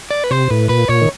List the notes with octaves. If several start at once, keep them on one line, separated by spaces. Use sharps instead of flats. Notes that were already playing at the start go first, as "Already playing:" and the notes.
D5
B4
C3 C5
A2 B4
A#2 B4
A#2 C#5
D#3